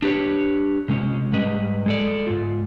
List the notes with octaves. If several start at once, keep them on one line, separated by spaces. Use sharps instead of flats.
D4 G4 B4 C#5
C3 G#3 C#4
G#2 G3 B4 D#5
G#3 A4 D5
G#2 F4